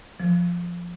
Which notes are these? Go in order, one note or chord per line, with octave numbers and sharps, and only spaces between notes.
F3